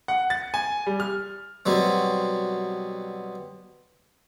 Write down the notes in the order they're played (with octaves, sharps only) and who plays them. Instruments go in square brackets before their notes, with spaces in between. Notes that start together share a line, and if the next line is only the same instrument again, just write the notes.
[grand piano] F#5
A6
G#5
G3
F6
[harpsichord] B2 F#3 G3 C4